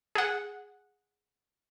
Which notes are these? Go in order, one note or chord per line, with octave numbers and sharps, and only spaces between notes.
G#4 F#5